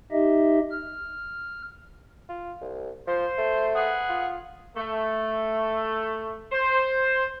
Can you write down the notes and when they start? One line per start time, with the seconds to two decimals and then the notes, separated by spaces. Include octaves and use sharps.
0.12 D#4 G4 D#5 E5
0.71 F6
2.29 F4
2.61 C2
3.07 F3 C5
3.38 A3
3.75 G#4 B4 F#5
4.09 F4
4.75 A3
6.52 C5